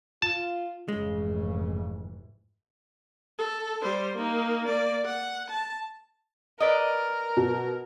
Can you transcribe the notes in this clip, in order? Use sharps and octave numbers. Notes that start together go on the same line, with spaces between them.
F4 A5
F1 G#2 C#3 E3 G#3
A4
G3 C5
A#3 D#4
A#3 D5
F#5
A5
A#4 B4 D5 D#5
B2